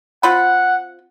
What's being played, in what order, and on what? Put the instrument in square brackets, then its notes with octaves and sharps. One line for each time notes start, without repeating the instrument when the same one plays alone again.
[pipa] C4 F4 B5 [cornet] F#5